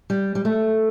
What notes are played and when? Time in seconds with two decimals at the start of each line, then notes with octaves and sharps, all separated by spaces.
0.10 G3
0.35 G3
0.45 A3